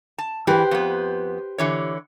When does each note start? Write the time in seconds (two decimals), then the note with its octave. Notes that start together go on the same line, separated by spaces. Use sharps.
0.18 A5
0.47 E3 G4 B4 C5
0.71 F2 B3
1.58 D3 E3 C#5